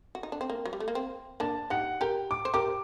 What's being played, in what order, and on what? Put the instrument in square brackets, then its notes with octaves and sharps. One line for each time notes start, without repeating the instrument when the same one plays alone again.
[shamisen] F#4
D#4
D4
C4
A#3
F#3
G3
A3
A#3
C4
[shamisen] A#3 D4 [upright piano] A5
[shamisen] D#4 G4 [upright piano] F#5
[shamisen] G4 A#4 [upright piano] G5
[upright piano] D6
[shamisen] C5
[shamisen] G4 A#4 [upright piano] D6